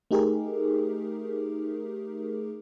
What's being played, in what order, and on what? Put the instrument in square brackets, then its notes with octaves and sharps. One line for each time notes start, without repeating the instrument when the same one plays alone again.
[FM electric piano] A3 D#4 G4 G#4 A#4